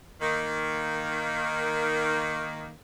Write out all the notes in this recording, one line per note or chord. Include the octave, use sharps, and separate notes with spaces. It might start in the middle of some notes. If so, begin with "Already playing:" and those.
D#3 A#3